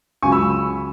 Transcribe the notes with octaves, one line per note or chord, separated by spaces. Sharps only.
C#2 C#3 F#3 G#5 C#6
B5 E6